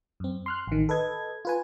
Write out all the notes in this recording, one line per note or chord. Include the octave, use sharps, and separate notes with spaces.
F#2 C4
C6 F6 F#6
A1 D#3
A4 B4 D#5 G#6
F4 B4 G#5